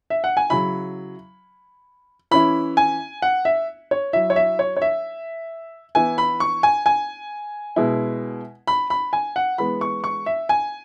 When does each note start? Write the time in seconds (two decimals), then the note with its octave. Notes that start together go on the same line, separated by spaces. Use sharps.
0.10 E5
0.24 F#5
0.37 G#5
0.50 C#3 F#3 E4 B5
2.31 E3 C#4 E4 B5
2.77 G#5
3.22 F#5
3.45 E5
3.91 C#5
4.13 F#3 E4 E5
4.30 C#5
4.36 E5
4.59 C#5
4.77 C#5
4.82 E5
5.95 E3 B3 E4 G#5
6.18 B5
6.40 C#6
6.63 G#5
6.86 G#5
7.76 B2 G#3 E4
8.67 B5
8.90 B5
9.13 G#5
9.36 F#5
9.58 E3 G#3 B3 B5
9.81 C#6
10.04 C#6
10.26 E5
10.49 G#5